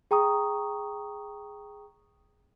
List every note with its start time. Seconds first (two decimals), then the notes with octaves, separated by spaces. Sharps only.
0.11 G#4 G5 A#5 C#6 D#6